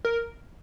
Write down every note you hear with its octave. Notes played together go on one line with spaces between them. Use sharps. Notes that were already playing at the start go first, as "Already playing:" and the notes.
A#4